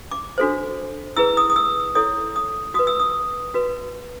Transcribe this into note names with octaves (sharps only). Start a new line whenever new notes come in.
D6
D4 F#4 A4 C5
E4 G#4 B4 E6
D#6
D#6
E6
E4 A4 C#5 D#6
D#6
F#4 B4 D#6
E6
D#6
F#4 B4